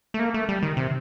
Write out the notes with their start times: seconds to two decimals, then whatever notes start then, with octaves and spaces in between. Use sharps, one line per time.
0.14 A3
0.19 A#3
0.34 A3
0.49 G3
0.63 D#3
0.77 C3